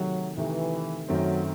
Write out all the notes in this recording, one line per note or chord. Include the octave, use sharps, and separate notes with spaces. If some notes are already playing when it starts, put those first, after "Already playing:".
Already playing: C3 D#3 F#3 A3
C3 D#3 E3 A3
F#2 D#3 F#3 A3 C4